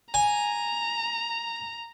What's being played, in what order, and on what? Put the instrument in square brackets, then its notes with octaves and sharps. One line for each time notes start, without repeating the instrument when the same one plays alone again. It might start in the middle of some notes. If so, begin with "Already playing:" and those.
[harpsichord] G#5 [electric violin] A#5